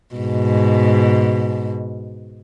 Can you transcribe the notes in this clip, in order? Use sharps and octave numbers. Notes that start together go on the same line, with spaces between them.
G#2 B2